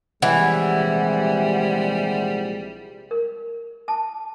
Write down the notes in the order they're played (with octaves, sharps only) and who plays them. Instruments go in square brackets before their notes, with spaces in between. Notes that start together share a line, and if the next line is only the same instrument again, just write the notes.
[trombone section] A#1 C3 G#3 [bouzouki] E3 [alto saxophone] G3 [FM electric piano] F#5
[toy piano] A#4
A5